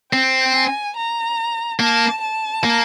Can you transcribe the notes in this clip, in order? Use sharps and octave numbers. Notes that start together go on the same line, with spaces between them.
C4 G5
G#5
A#5
A#3 A5
A5
A#3